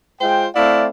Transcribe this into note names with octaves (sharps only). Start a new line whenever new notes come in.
G#3 F4 C5 G5
A3 C4 E4 D5 F5